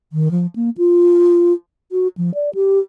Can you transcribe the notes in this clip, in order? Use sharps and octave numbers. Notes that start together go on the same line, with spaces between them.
D#3
F3
A#3
F4
F#4
F3
D5
G4